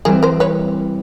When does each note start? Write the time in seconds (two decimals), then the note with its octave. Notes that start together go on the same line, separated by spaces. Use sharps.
0.05 E3 G3 C4 G#4 A#4
0.23 A#4 C5
0.40 B4 C#5